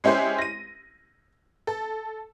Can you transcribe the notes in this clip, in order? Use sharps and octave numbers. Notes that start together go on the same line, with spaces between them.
G#3 C#4 E4 G4 C5 G#5
A#6 D#7
A4